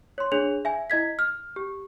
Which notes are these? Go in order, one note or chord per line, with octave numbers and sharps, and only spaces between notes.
C#5 C6
D4 G#4 C#5 F7
E5 G#5
E4 D#5 G#6 B6
F6
G4